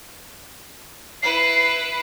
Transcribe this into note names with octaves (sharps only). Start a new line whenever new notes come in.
E4 B4 C7